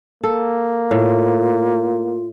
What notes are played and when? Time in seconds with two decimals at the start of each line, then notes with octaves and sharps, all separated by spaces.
0.24 A#3 A4
0.91 A2 F4